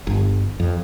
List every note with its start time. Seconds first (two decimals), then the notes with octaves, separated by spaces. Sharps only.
0.07 G1
0.60 F2